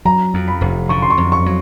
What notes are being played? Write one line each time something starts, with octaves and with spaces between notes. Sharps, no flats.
F#3 A#5
F2
B5
F1
D3 C#6
C6
C#6
F2
C#6
F#3